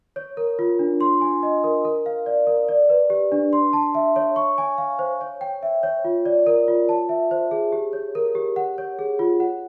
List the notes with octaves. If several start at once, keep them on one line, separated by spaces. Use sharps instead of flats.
C#5
A#4
F4
D4
C6
G#5
D#5
A#4
A#4
F5
D5
A#4
D5
B4
G4
D4
C6
A5
E5
C#5
C#6
G#5
F5
C5
C#5
G5
E5
C#5
F4
D5
A#4
F4
A5
E5
C5
G#4
G4
C#5
A#4
G4
F#5
C#5
G#4
F4
F#5